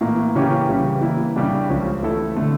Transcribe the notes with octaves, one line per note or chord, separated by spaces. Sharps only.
A2 E3 A#3
C#3 E3 A#3 C#4 G4
C#3 E3 G3
E3 A#3 E4
C#3 G3 D4 G4
C#2 C#3 F3 C#4
E3 A3 E4 A4
D3 A3